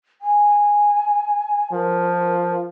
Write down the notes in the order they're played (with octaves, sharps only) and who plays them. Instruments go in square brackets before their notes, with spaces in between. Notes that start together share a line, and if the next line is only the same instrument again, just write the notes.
[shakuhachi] G#5
[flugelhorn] F3 [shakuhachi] A#4